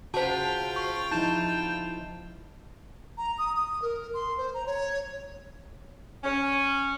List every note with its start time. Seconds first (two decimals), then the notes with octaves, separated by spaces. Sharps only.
0.14 C#3 F4 F#4 C5 G5 A5
0.76 C#6
1.12 F3 D#4 E4 A5 G6 E7
3.18 A#5
3.38 D#6
3.56 D#6
3.82 A#4
4.14 C6
4.38 C5
4.54 A#5
4.67 C#5
6.24 C#4